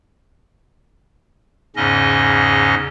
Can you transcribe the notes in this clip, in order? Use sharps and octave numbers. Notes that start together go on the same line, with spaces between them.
E2 G#2 C#3 C#4 D#5